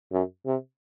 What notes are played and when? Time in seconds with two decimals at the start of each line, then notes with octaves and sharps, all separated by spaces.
0.12 F#2
0.46 C3